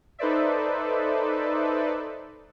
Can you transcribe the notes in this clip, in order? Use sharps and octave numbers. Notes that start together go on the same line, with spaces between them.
D#4 A4 B4 C5 D5 E5